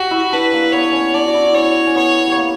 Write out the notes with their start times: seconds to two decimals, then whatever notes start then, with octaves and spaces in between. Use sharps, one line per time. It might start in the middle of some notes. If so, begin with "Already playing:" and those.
Already playing: F#4 G4
0.11 E4
0.32 D4 B4
0.53 A#3
0.72 B3 C#5
0.93 C#4
1.14 D4 D5
1.26 F#4
1.34 E4
1.54 C#4 C#5
1.87 C#4
1.96 B3 C#5
2.28 G3
2.36 A#3